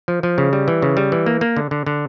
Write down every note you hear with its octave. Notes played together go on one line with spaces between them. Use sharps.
F3
F3
C#3
G3
E3
C#3
G3
E3
A#3
A#3
D3
D3
D3